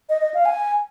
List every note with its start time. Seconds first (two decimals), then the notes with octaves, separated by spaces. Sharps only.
0.09 D#5
0.21 D#5
0.34 F5
0.45 G#5